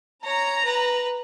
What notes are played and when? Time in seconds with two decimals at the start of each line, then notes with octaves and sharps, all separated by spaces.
0.24 C#5 A#5
0.64 B4